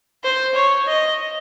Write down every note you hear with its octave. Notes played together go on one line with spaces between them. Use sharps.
C5
C#5
D#5